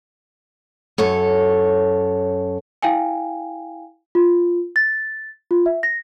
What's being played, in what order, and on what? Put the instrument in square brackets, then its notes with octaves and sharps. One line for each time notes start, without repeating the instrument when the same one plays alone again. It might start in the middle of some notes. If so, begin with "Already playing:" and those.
[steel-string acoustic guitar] F#2 A4 C#5
[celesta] E4 F5 G5 G#5
F4
A6
F4
E5
A#6